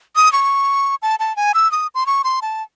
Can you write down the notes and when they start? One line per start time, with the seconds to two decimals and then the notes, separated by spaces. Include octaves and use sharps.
0.16 D#6
0.33 C#6
1.02 A5
1.20 A5
1.36 G#5
1.54 E6
1.72 D#6
1.95 C6
2.06 C#6
2.24 C6
2.42 A5